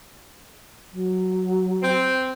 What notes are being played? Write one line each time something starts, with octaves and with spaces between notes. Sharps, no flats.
F#3
C4